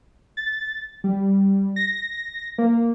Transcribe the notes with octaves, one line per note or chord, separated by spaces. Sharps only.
A6
G3
A#6
A#3